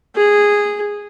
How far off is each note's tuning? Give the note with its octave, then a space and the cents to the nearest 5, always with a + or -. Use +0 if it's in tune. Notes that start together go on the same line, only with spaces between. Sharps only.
G#4 -10